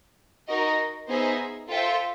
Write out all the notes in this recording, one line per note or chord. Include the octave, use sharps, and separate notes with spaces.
D#4 F#4 A#4 D#5
B3 D#4 G#4 C5 E5
F4 A4 C5 E5 G5